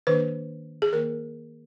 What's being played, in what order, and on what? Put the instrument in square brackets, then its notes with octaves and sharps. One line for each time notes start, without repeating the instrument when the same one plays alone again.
[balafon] D#3 A#3 D4 B4
G#4
D#3 A#3 A#4